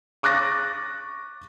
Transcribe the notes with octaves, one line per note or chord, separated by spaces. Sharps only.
C#6 D6 F#6 A6 A#6